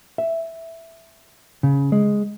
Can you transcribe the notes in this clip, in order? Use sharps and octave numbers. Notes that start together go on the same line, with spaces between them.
E5
C#3
G#3